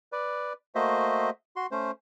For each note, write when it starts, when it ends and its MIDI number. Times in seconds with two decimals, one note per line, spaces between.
0.12 0.53 71
0.12 0.53 74
0.75 1.30 57
0.75 1.30 58
0.75 1.30 66
0.75 1.30 72
0.75 1.30 75
0.75 1.30 76
1.56 1.66 66
1.56 1.66 84
1.72 1.91 57
1.72 1.91 61
1.72 1.91 72